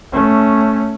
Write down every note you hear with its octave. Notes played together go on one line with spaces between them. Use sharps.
A3 C#4